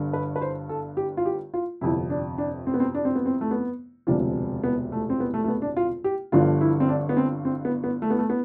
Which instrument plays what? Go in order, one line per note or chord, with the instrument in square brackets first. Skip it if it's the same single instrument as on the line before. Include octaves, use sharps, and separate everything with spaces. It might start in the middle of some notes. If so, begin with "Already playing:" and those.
Already playing: [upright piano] G1 G2 D3
B4
B4
C5
A4
G4
F4
G4
F4
G1 F2 C3 E4
D4
D4
C4
B3
C4
D4
C4
B3
C4
A3
B3
E1 D2 C3 F3 D4
B3
A3
C4
B3
A3
A3
B3
D4
F4
G4
G1 G2 D3 F3 F4
E4
C4
D4
B3
C4
C4
B3
B3
A3
B3
A3
B3